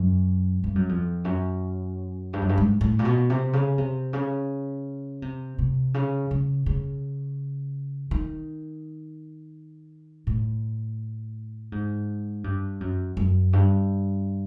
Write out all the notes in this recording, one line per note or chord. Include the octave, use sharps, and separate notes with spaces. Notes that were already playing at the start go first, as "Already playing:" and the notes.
Already playing: F#2
G2
F#2
F2
F#2
G2
F#2
G2
G#2
A2
A#2
B2
C3
C#3
C3
C#3
C3
C3
C#3
C#3
C#3
D#3
A2
G#2
G2
F#2
F#2
G2